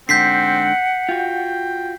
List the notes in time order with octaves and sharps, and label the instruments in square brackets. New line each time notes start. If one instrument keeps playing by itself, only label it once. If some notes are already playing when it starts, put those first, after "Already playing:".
[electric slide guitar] G#2 D3 [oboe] C4 [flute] F#5 [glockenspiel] G6 B6 C7
[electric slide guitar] F4 F#4 [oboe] G5